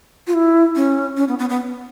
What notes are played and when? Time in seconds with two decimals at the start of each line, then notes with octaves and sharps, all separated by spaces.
0.27 F4
0.34 E4
0.76 C#4
1.17 C#4
1.28 B3
1.39 B3
1.49 B3